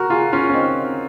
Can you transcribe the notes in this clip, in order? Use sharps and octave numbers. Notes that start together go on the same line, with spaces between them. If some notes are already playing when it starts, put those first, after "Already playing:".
Already playing: F#4 A#4
F4 G#4
C#4 F4
C#4
C4 D#4